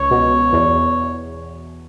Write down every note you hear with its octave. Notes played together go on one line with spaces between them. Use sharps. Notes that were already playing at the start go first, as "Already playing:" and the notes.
Already playing: C#2 C#5
B2
E2